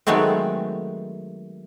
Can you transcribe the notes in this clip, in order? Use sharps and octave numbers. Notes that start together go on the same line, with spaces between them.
D#3 F#3 G#3 A3 B3 C4